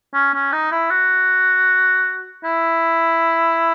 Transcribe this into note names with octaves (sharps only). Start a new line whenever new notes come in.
C#4
C#4
D#4
E4
F#4
E4